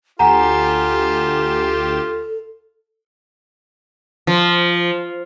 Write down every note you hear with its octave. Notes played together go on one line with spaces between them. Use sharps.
D2 F4 G4 A4 F#5 G#5 A#5 E7
F3